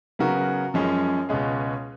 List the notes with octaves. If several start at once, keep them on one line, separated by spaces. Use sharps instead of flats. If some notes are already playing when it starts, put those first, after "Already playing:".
C#3 F#3 B3 F#4 A#4
F#2 F3 G#3 C#4 G#4
C#2 B2 G#3 C#4 G#4